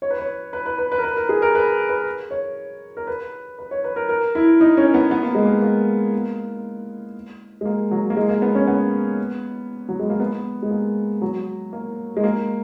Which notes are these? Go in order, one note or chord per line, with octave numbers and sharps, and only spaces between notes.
C#5
B4
C#5
B4
B4
B4
B4
A#4
B4
A#4
G#4
A#4
B4
B4
C#5
A#4
B4
B4
C#5
B4
A#4
A#4
E4
D#4
C#4
B3
B3
A#3
G#3
A#3
A#3
G#3
A#3
F#3
A#3
G#3
A#3
B3
C#4
B3
F#3
G#3
A#3
B3
G#3
A#3
F#3
A#3
G#3
A#3